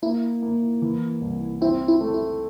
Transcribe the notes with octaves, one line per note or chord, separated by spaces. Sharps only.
A#3 E4
A#3
E3
C2
C4 E4
E4
A3
E4